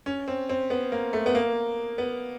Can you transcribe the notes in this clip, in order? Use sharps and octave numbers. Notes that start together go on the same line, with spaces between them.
C#4
C4
C4
B3
A#3
A3
B3
A#3
B3